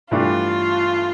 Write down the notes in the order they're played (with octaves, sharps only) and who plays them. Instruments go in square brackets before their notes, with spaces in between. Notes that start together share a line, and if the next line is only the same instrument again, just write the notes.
[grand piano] G2 E3 A3 D4 G4 [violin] F4